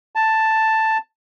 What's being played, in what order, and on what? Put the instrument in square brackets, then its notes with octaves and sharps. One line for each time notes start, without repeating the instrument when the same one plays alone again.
[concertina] A5